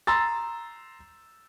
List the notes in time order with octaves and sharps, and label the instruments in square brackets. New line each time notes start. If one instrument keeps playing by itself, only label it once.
[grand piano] A#5 C6 E6 A6